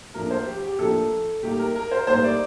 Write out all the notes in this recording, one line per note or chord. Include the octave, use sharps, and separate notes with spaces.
A2 F3 A#3 D4 A#4
C5
G4
G4
A2 F3 A#3 D4 A4
A2 G3 A#3 D#4 G4
A#4
A#4
C5
A2 G3 A#3 D#4 C5
D5